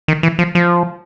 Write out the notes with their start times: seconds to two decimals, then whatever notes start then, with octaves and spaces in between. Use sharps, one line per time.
0.08 D#3
0.23 E3
0.39 F3
0.55 F3